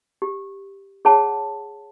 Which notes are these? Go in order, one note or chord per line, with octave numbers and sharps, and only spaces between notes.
G4
G#4 C#5 F#5 A5